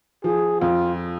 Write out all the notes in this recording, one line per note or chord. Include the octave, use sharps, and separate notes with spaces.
F3 G#4
F2 F4